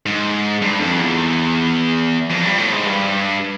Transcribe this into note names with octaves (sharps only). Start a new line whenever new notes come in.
G#2
G2
F2
E2
F2
G2
A2
G#2
G2